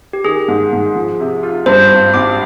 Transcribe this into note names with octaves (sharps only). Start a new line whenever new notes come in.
G4
D#3 G#4
G#2
G#2
F3
C3
F4
G2 C5
G#1
G#1 D6